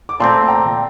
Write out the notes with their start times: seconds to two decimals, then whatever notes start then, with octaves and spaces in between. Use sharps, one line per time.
0.09 D6
0.20 A#2 A3 C4 A5 C6
0.48 G5 A#5